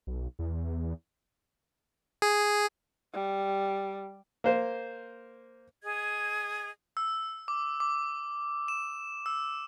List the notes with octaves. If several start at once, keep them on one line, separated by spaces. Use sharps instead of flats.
B1
E2
G#4
G3
A#3 C5
G#4 D#5 G#6
E6
D6
D6
E7
E6